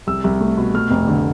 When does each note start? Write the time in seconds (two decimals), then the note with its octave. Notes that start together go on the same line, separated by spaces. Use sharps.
0.07 C2 E6
0.24 C2
0.41 A3
0.57 B2
0.74 A3 F6
0.90 F1
1.08 D3